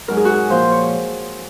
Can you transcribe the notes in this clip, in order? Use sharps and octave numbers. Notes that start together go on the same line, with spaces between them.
G#2 F#3 A#4
G#4
F#4
G#4
A#2 F3 C5
C#5